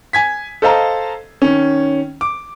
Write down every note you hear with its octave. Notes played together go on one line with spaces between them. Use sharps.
G#5 G#6 B6
A4 C5 D#5 F5 A5 A#5
D#3 C#4
D6